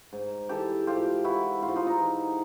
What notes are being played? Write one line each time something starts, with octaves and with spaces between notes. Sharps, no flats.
G#2
E3 G4 A4
G#2 F4 G4
E3 E4 F#4
G#2 F4
F#4
D#4 F4
D#4 F4
E3